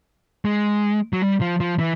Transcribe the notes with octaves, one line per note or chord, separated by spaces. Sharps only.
G#3
F#3
G3
F3
F3
E3